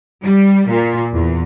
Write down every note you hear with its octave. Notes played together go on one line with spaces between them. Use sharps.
G3
A#2
E2